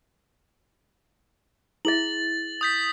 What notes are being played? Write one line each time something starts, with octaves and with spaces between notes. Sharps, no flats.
E4 G#4 E5 A6 F#7
D#6 G6 B6